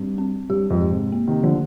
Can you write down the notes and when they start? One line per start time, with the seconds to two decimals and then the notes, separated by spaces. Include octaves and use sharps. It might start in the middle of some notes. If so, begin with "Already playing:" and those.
Already playing: G2 C4
0.18 C4
0.50 G2 G4
0.70 F2 G#2
0.81 G4
0.91 G#2 C3
1.12 A#3
1.27 C3 D#3
1.43 D3 D#3 F3